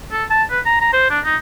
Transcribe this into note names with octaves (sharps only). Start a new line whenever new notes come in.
A4
A5
B4
A#5
A#5
C5
D4
D#4